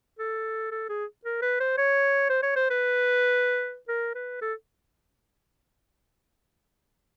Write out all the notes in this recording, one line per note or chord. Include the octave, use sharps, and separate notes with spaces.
A4
A4
G#4
A#4
B4
C5
C#5
C5
C#5
C5
B4
A#4
B4
A4